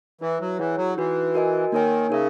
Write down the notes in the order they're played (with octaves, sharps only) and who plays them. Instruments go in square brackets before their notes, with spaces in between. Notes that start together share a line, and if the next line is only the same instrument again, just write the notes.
[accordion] E3 [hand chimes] E4 B4 E5
[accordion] F#3
[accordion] E3 [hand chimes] E4 G#4 C#5 F#5
[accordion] F#3
[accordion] E3 [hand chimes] D#4 F#4 B4
[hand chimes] F#4 A#4 D#5 G#5
[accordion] D#3 [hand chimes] A#3 D#4 A#4 C#5 G#5
[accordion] C#3 [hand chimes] D#4 A#4 E5